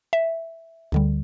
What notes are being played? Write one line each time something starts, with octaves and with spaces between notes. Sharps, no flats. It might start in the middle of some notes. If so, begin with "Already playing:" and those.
E5
D2 D3 G3